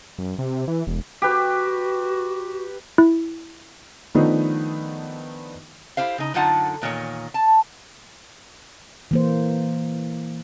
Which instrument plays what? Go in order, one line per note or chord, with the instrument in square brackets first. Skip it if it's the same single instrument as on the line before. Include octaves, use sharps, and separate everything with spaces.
[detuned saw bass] F#2
C3
E3
E1
[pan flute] F#4 [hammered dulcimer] G4 B4
[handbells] E4
[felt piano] D#3 F3 A3 B3 D4 D#4
[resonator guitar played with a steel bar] E4 G4 C5 F5
C#3 D#4
F#2 D3 D#4 F4 F#5 A5
E2 A#2 D#3 C#5
A5
[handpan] E3 A#3 C5